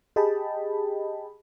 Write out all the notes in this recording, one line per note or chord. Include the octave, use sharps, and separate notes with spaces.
G4 G#4 D#5 G5 A5 B5